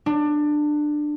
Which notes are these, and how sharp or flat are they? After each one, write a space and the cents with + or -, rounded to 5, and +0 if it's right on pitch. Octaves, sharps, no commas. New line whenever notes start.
D4 +20